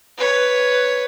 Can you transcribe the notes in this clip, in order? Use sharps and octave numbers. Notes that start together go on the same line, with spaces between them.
B4 C#5